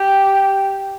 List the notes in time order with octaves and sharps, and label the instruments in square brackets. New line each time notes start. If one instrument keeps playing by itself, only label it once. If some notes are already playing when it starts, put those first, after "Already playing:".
Already playing: [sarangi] G4